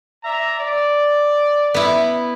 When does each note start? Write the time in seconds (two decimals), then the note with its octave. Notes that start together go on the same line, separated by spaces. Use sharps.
0.24 D5 E5 A#5
0.60 D5
1.74 B3 E4